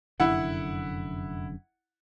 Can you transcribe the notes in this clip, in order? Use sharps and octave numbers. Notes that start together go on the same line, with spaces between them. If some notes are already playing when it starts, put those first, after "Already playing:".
F1 F#2 D3 E4 F#5